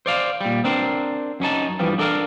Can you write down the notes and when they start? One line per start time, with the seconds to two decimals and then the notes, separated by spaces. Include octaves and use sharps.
0.06 C5 D5 F5
0.41 A#2 G3
0.64 C4 D4 A#4 C5
1.40 F#2 C#4 D#4 A5
1.79 G2 E3 F3 G3
1.98 D4 A4 A#4 E5 F5